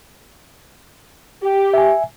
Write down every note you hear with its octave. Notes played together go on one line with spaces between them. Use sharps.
G4
E5 G#5